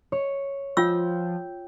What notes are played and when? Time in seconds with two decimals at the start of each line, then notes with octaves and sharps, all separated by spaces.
0.12 C#5
0.77 F3 F4 G5 E6